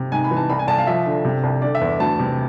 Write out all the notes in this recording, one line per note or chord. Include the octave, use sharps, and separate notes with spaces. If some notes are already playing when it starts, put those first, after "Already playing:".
Already playing: C3
G#2 G#5
B5
E3
A5
C2 B5
G#5
C2 A5
F5
F3 E5
D3
C3
C2
D3 D5
E5
E2
D2 A5
C3